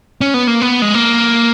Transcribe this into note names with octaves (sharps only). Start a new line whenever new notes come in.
C#4
B3
A#3
B3
G#3
A#3